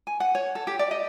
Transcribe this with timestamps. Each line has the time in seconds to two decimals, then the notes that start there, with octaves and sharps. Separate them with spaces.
0.07 G#5
0.20 F#5
0.35 C#5
0.55 A4
0.67 G4
0.79 D5
0.91 D#5